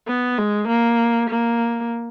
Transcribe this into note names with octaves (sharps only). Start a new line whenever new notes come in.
B3
G#3
A#3
A#3